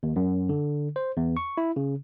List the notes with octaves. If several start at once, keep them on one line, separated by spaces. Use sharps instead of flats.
D#2
F#2
D3
C5
E2
C#6
E4
C#3